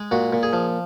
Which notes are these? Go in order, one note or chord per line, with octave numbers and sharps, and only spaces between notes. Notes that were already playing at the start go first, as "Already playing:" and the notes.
Already playing: G#3
A#2 F#4
A#2
G#4
F3